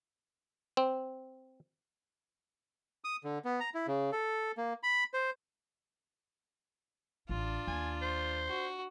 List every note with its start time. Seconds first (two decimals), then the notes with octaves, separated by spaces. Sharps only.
0.77 C4
3.04 D#6
3.24 D3
3.45 B3
3.60 A#5
3.74 E4
3.87 C#3
4.12 A4
4.57 A#3
4.83 B5
5.14 C5
7.29 A1 D4 F4
7.67 D#2 G#5
8.02 C5
8.48 F#4